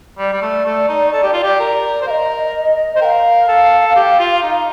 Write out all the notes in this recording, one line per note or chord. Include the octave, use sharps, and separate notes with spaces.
G3 D5
G3
A3
A3
D#4
A4
G4
F4
G4
A#4
C5
A#4 D#5 F5
C5
A#4 F5 G5
A4
G4
F4
D#4